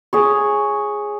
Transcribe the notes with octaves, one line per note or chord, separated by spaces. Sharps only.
G#4 C#5